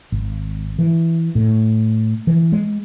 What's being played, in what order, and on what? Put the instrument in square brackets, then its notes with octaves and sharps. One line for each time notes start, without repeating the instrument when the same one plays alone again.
[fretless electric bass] G#1
E3
A2
E3
G#3